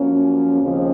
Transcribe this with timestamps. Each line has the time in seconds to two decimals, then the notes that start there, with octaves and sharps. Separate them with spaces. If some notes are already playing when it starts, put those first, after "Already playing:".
Already playing: F#2 F3 A#3 C#4
0.60 D#2 C#3 F3 C4